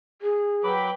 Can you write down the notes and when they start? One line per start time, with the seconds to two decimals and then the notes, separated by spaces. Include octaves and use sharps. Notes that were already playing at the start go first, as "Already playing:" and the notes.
0.22 G#4
0.64 F#3 B4 G5 B5 D6